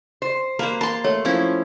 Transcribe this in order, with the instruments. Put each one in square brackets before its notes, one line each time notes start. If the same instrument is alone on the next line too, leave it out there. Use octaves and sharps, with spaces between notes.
[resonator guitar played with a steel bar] C5
[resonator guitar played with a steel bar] A#3 [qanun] B4 C5
[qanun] A5 C6 [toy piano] B5
[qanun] A3 [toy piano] C#5
[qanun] F3 C#4 E4